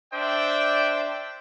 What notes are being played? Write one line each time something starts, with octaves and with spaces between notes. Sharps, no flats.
D4 C5 D5 E5 G5